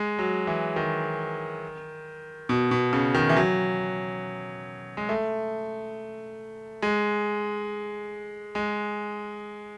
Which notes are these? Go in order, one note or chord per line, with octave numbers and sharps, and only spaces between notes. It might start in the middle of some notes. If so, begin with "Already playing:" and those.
Already playing: G#3
F#3
E3
D#3
B2
B2
C#3
D#3
E3
F#3
G#3
A3
G#3
G#3